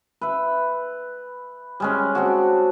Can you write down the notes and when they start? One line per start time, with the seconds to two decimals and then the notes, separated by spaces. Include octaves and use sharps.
0.21 B4 E5
1.80 G3 G#3 C#4
2.15 C4 D4 F#4